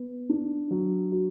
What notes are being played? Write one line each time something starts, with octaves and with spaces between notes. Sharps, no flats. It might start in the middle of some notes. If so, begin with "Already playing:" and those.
Already playing: B3
D4
F#3
F#4